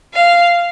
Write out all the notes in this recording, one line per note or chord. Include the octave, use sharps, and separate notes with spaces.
F5